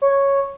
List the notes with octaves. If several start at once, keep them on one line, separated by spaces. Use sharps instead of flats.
C#5